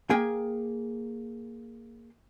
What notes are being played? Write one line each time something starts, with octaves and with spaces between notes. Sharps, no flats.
A#3 G#4 G5 G#5